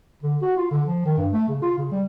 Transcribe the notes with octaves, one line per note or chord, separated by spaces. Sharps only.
D3
F#4
F4
D3
F3
D#3
G2
A3
C#3
F4
C#3
G3